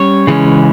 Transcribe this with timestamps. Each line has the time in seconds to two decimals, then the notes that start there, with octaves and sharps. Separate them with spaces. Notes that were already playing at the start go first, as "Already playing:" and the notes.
Already playing: G3 C#4 C#5
0.27 C#3 E3 G#3 C#4